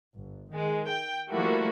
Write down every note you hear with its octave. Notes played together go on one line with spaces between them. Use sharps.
G1
D#3 G#3
G5
F3 G3 A3 A#3 E4 F#4